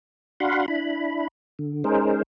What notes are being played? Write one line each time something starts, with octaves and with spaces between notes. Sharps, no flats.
D4 F#4 F5 F#5 B5 C6
D4 E4 B5
D3
G#3 C#4 D#4 G#4 A#4 C5